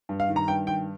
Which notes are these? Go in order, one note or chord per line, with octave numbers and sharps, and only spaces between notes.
G2
F5
D#3
A#5
G2 G5
D#3 G5